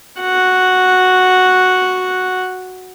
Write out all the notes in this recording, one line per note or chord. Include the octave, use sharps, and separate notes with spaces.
F#4 F#5